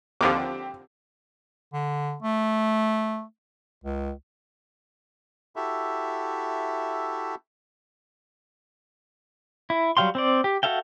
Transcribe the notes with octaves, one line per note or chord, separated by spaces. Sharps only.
D#2 D3 F3 C4 G4 D6
D3
A3
C#2
E4 F#4 G4 A4 E5
E4
F#3 G3 F5 G5 C6
C4 C5 D5
G4
F#4 A4 E5 F5 G5